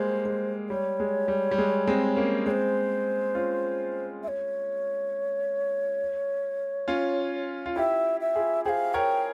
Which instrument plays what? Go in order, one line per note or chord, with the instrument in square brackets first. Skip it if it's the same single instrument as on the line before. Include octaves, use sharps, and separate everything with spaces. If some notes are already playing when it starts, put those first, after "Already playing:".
Already playing: [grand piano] G3 G#3 A#3 [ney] C5
[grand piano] G#3
[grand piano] G3 [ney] C#5
[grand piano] G#3
G3
G3
G#3
G#3 C4
A#3 C#4
[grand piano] G#3 C4 [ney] C#5
[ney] C5
[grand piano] C#4 F4
[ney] E5
C#5
[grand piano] C#4 F4
F4
[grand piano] E4 G4 [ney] E5
[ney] E5
[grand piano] F4 G#4
[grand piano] G#4 C5 [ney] F5 G5
[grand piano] A#4 C#5 [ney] G5